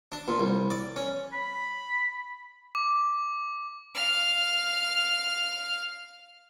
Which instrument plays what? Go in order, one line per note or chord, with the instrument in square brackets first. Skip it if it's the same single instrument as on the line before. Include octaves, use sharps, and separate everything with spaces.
[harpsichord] D4
A#2
C2
D5
C#4
[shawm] B5
[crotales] D6
[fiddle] F5 F6